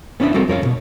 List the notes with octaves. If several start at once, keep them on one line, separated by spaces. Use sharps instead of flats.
B3 C#4 D4 B4 E5
G3 C4 F#4 A4 A#4
F2 A#4 C#5 F5
E2 B2